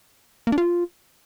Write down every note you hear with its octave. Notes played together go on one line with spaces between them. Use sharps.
A#3
D4
F4